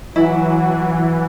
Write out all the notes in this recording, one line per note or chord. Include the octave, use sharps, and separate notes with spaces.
E3 F#3 E4 F#4